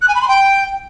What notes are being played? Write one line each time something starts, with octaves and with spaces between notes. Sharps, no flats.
F#6
G#5
B5
C6
G5